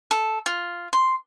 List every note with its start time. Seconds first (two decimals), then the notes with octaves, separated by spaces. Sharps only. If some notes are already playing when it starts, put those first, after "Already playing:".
0.11 A4
0.46 F4
0.93 C6